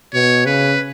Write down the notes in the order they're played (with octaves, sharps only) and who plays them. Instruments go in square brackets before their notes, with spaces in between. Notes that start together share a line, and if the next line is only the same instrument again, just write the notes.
[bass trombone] B2 [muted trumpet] C#5
[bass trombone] C#3 [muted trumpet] B4